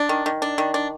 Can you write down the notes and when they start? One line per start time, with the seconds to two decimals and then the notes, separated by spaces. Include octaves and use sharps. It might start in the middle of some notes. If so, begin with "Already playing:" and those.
Already playing: D4
0.09 D#3
0.26 D#3
0.42 D4
0.58 D#3
0.74 D4